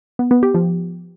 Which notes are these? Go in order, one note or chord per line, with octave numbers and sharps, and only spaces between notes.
B3
B3
G4
F3